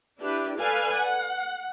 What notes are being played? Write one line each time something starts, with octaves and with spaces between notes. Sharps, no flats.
D4 E4 G4 B4
A4 B4 D5 F5 G#5
F#5